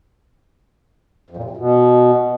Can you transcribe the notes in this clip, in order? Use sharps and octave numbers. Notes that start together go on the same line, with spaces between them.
F2
A#2
C3
F#2
B2